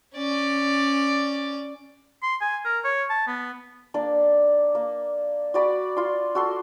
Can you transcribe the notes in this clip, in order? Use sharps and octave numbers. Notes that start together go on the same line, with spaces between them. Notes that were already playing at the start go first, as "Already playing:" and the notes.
C#4 D5
C6
G#5
A#4
C#5
A5
B3
A#3 D4 D5
A#3
F#4 D5 B5 D6
F4 C6
F#4 A4 C6